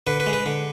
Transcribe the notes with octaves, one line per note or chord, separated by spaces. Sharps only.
D3 B4
B4
G#3
B4
D3